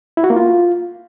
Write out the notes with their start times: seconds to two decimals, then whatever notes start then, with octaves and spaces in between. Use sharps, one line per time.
0.17 E4
0.24 F#4
0.30 A#3
0.36 F4